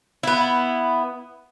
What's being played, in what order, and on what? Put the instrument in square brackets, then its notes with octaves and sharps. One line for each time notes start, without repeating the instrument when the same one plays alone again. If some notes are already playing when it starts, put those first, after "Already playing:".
[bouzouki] B3 E4